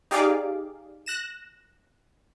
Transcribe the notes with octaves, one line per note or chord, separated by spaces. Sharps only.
D#4 G4 G#4 D5 F5 D6
F#6 A#6 E7